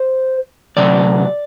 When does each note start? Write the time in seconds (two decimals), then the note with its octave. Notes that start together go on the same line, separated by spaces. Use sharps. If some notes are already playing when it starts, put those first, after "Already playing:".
Already playing: C5
0.77 D2 C3 F#3 D5